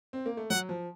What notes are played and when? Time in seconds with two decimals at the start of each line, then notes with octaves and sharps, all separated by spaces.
0.13 C4
0.26 A#3
0.37 A3
0.50 F#3 F#5
0.69 F3